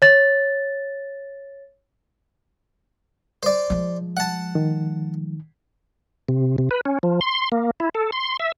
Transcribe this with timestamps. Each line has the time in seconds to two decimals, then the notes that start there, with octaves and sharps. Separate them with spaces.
0.02 C#5 A6
3.43 C5 D5
3.70 F3 G#3
4.17 F#5 A5
4.55 D#3
6.29 C3
6.58 C3
6.71 B4
6.85 C#4
7.03 F3
7.21 C6
7.52 A#3
7.80 E4
7.95 A4
8.12 C6
8.40 E5